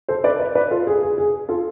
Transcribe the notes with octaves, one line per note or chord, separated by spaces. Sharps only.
A4 C5
B4 D5
B4 D5
B4 D5
F4 A4
G#4
G#4
G#4
F4 A4